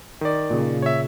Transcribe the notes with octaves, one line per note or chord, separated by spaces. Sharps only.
D#3 D5
A#2 C#3
C#5 E5